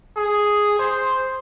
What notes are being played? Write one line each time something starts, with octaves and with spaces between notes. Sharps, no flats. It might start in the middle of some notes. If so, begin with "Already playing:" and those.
G#4
C5